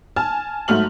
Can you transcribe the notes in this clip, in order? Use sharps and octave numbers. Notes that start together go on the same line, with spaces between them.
G#5 A5 F6
G#2 F#3 A3 F6 F#7